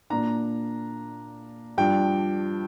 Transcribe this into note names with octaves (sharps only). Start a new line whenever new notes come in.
A#2 A#3 D4 A#5
G2 F3 D4 G5